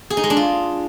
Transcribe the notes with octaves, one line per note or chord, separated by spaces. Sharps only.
G#4
D#4
G#3
D4
F4